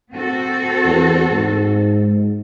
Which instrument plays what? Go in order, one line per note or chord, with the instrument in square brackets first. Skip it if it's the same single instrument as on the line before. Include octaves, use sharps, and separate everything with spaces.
[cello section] C4 F#4 A4
[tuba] E2
G#2